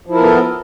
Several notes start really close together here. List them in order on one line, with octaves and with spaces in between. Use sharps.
F3 E4 A#4 B3 A4